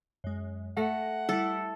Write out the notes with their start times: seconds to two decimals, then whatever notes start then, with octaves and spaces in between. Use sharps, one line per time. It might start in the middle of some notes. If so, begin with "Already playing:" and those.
0.24 F#2 G#3
0.77 A3 F#5 A#6
1.29 G3 E4 A4